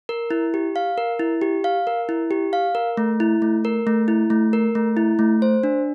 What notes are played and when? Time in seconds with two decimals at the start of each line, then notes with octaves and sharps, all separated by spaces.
0.09 A#4
0.30 E4
0.54 G4
0.76 F5
0.98 A#4
1.19 E4
1.41 G4
1.64 F5
1.87 A#4
2.09 E4
2.31 G4
2.53 F5
2.75 A#4
2.97 A3
3.20 E4
3.42 A3
3.65 A#4
3.87 A3
4.08 E4
4.30 A3
4.53 A#4
4.75 A3
4.97 E4
5.19 A3
5.42 C5
5.64 D4